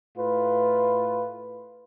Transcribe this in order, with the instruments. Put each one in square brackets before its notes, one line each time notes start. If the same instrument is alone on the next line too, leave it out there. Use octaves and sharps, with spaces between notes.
[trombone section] A2 F4 B4